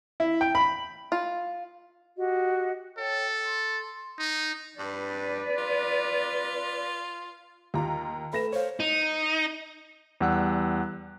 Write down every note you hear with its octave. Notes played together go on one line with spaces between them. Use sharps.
E4
G5
B5
F4
F#4 G4 D#5
A4 C#5 G5
C6
D#4
G2 B4 D5
F4
D#2 F4 G4 A#5
A3 B4 B5 A#6 E7
C5 C#5 F5
D#4
E2 G3 F#5 E6 F#6